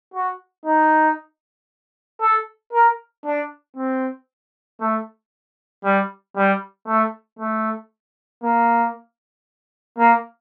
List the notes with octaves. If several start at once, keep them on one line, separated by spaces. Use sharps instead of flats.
F#4
D#4
A4
A#4
D4
C4
A3
G3
G3
A3
A3
A#3
A#3